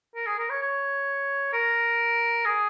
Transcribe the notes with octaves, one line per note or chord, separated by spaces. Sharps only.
A#4
G#4
A#4
C#5
C#5
A#4
G#4